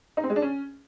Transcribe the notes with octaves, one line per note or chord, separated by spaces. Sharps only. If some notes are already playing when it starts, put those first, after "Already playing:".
D#4
C4
G#3
D4
C#4